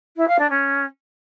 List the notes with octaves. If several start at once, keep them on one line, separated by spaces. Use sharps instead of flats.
E4
F5
D4
C#4